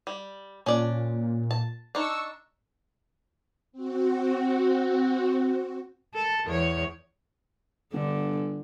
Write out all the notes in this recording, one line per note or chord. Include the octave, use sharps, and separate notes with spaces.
G3
A#2 C#4 D4 D5
A5
D4 D#4 C#6 E6
C4 F#4
A4
E2 C#5
G1 D3